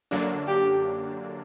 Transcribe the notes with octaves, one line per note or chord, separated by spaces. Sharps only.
F#2 D3 F#3 A#3 D4
G4